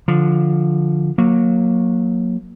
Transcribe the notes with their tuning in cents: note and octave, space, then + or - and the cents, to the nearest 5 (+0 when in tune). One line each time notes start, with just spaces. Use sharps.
D3 +0 F3 +0
F#3 -20 A#3 +0